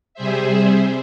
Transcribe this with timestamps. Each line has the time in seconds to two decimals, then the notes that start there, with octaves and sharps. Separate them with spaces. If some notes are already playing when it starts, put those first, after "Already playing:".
0.14 C3 G3 G#4 C5 E5